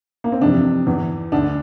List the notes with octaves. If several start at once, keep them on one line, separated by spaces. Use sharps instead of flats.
A#3
C4
F2 C3 E3 D4
E2 E3
D2 D3 D4